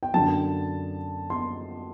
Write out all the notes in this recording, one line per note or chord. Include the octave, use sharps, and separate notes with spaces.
G5
F#2 D3 A5
C6